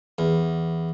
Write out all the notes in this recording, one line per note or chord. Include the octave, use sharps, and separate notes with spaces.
E2